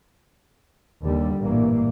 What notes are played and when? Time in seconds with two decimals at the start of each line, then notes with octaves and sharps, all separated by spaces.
1.04 D#2 D3 G3
1.39 A1 G2 A#2 E3 A#3